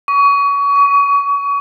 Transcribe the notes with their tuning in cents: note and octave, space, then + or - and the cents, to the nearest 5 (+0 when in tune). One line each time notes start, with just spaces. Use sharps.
C#6 +30
C#6 +40